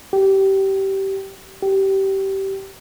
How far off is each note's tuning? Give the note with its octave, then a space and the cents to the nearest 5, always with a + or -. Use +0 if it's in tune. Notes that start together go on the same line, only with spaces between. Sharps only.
G4 -20
G4 -20